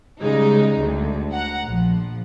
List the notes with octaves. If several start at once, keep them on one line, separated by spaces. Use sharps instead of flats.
C#3 G3 G#3 D#4
D2
F#5 A#5
A#1 F3